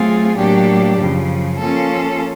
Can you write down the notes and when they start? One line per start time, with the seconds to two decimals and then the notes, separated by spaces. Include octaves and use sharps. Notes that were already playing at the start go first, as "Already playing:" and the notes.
Already playing: F#3 A3 C4 F4 G#4
0.36 A2 F#3 A#3 D4 G4
0.98 F#2 C#3 F3
1.59 F3 A#3 C#4 F4 A4